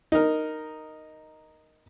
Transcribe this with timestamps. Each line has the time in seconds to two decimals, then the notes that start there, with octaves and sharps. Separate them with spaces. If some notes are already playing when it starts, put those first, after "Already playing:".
0.12 D#4 A#4